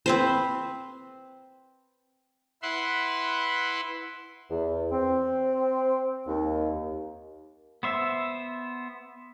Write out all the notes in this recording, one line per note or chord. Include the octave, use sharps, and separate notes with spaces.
C4 B4 C5
E4 B4 E5 F#5 C6
E2
C4
D#2
B3 C5 E5